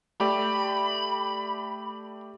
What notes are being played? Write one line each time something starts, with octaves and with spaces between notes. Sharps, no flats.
A3 G4 D5 B5